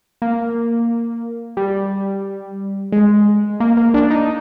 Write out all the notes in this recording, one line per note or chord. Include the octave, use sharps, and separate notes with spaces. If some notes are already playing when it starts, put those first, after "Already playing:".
A#3
G3
G#3
A#3
A#3
D4
D#4